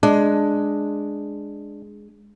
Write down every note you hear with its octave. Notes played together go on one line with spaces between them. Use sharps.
G#3 D4